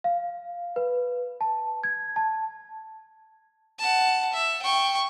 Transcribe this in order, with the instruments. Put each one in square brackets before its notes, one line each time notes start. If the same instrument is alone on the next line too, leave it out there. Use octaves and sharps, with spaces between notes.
[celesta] F5
B4
A5
G#6
A5
[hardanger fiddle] F#5 A5
E5
G5 C#6